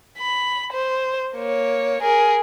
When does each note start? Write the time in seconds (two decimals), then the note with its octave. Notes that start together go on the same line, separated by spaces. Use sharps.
0.19 B5
0.73 C5
1.36 A#3 C#5
2.02 G#4 A#4